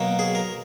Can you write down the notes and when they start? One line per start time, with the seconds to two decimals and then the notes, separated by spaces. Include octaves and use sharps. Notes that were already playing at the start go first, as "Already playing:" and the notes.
Already playing: B2 F#3 A#3
0.19 G#4
0.35 A#4